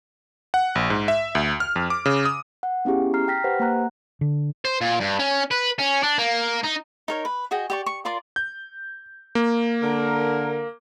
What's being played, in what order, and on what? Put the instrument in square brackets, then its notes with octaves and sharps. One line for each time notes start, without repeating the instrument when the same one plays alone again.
[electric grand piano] F#5
A#1
G#2
E5
D2
F6
F2
D6
C#3
D#6
[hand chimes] F#5
B3 C#4 E4 G4 G#4
A#5 F6 C7
G5 F6 A#6 B6
G4 B4 C5 F#5
A#3 F#5 A#5 F#6
[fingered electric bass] D3
[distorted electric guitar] C5
A#2
G2
C#4
B4
C#4
D4
A#3
D#4
[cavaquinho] D#4 A#4 C#5
B4
F#4 G#4 D#5 G5
G4 D5 C#6
C#6
F4 A#4 D5 C6
[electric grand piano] G6
A#3
[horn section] D3 A#4